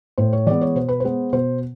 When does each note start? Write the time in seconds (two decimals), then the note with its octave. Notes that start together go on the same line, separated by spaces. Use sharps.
0.18 A2 C5
0.33 C#5
0.46 E3 G#3 B3 D5
0.61 C#5
0.75 B2 C5
0.88 B4
1.00 G#3 B3 C5
1.32 B2 C5